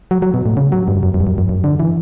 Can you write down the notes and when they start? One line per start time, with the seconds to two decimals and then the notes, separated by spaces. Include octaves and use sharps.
0.11 F#3
0.22 F#3
0.34 B2
0.46 A2
0.57 C#3
0.72 F#3
0.88 G2
1.03 F#2
1.14 F#2
1.20 G2
1.27 F#2
1.38 F#2
1.49 F#2
1.64 D3
1.80 E3